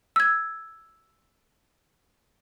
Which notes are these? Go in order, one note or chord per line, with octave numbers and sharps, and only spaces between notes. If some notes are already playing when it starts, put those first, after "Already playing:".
E6 G#6